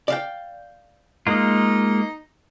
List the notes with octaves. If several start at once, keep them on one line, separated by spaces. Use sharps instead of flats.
D5 F5 G5
G#3 A#3 D#4 F4